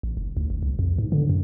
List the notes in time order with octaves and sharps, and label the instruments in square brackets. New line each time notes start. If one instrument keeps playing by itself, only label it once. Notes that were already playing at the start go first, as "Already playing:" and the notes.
[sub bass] A1
F#1
D2
G#1
C2
F2
G#2
D3
F#2